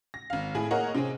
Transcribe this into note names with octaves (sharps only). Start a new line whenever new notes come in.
A#6
G#1 F5
A2 G#4 G#5
A#3 G#4 A#4 C#5 D#5 F#5
C3 C4 C#4 G#4